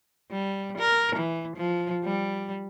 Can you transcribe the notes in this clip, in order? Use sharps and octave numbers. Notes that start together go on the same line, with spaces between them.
G3
A#4
E3
F3
G3